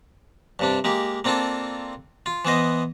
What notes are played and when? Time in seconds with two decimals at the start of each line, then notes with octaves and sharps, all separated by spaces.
0.59 G2 C3 D4
0.84 G#3 A#3 G4
1.24 A#3 C4 D4 F4 A4
2.26 F4
2.45 E3 B3 C5 D#5